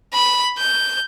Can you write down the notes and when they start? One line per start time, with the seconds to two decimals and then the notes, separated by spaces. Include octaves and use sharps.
0.13 B5
0.58 G6